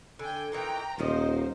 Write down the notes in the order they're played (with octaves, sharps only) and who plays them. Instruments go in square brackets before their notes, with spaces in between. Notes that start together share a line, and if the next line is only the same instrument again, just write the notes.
[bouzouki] D3 [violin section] G5 G#5
[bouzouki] A#2 D#3 E3 [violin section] G5 A#5
[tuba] D#1 [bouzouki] D#3 F3 D#5 [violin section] D#4 C5